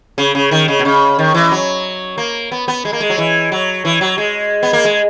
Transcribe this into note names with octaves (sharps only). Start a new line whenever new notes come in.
C#3
C#3
D#3
C#3
B2
C#3
D#3
E3
F#3
A#3
B3
B3
G#3
A#3
G#3
F#3
E3
F#3
E3
F#3
G#3
B3
A#3
G#3